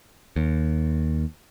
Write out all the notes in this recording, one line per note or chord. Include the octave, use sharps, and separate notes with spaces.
D#2